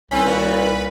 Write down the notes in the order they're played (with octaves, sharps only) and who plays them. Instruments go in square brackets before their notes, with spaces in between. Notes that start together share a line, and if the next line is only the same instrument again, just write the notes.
[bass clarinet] C2 [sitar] D#3 C4 D#4 [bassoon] C#4 [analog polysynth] B4 B5
[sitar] D#2 F#4 A#4 [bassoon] A#2